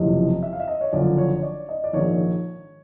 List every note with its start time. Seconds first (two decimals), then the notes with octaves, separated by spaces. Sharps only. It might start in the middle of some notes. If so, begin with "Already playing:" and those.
Already playing: F#1 F2 C3 E3 D#5
0.43 E5
0.53 F5
0.60 E5
0.68 D#5
0.81 C#5
0.93 F#1 F#2 D3 F3 D5
1.18 C#5
1.43 D5
1.69 D#5
1.84 D5
1.93 A#1 G#2 D#3 C#5